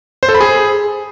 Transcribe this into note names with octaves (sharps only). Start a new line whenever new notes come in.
C5
A4
B5
G#4